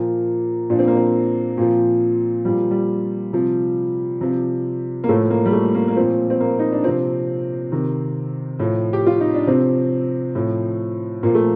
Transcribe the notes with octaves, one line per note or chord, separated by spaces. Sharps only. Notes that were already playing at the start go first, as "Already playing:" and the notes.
Already playing: A#2 F3 A#3
A#2 F3 D4
C4
A#3
C4
A#2 F3
A#2 F3 G3
G3
C3 F3
C3 F3
A#3
A2 F3 A3
A#3
G3
A3
A#3
A#3
A#2 F3 C4
C4
A#3
D#4
D4
C3 F3 C4
C3 D#3
A2 F3
G4
F4
D#4
D4
C3 F3 C4
A2 F3
A#2 F3 A#3
A3